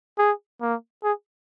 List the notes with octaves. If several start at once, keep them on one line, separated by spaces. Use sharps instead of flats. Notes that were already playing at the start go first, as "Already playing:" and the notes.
G#4
A#3
G#4